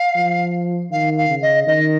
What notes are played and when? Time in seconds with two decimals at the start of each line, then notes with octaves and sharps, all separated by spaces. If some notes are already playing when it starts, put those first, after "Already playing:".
Already playing: F5
0.16 F3
0.91 D#3 F5
1.17 F5
1.29 C#3
1.42 D#5
1.67 D#3 D#5